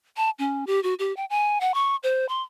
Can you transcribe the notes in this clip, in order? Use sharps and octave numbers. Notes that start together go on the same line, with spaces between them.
A5
C#4
G4
F#4
G4
G5
G#5
F#5
C#6
C5
C6